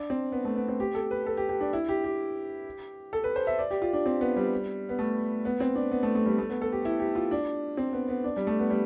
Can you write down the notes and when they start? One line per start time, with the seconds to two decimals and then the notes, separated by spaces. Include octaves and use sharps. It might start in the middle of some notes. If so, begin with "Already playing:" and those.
Already playing: D4
0.10 C4
0.32 B3
0.45 A3
0.56 B3
0.68 C4
0.80 G4
0.95 A4
1.11 B4
1.26 A4
1.37 G4
1.49 G4
1.61 D4
1.73 E4
1.89 G4
2.04 G4
3.13 A4
3.24 B4
3.36 C5
3.47 E5
3.59 D5
3.71 G4
3.82 F4
3.93 D4
4.06 C4
4.21 B3
4.36 G3
4.89 B3
4.99 A3
5.45 B3
5.60 C4
5.75 D4
5.92 B3
6.03 A3
6.15 A3
6.26 G3
6.38 A3
6.50 B3
6.61 A4
6.72 G4
6.85 E4
7.00 G4
7.15 F4
7.31 D4
7.77 C4
7.93 B3
8.09 B3
8.24 D4
8.36 G3
8.47 A3
8.59 B3
8.70 G3